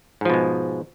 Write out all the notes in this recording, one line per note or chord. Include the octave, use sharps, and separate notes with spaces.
G#2 B2 F3 G#3